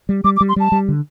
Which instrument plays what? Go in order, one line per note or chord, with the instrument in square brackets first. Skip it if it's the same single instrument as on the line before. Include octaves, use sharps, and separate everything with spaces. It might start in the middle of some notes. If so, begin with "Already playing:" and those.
[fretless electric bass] G3
[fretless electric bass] G3 [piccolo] D6
[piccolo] D6
[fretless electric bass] G3
[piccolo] C6
[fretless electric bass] G3 [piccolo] A5
[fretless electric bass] G3
D3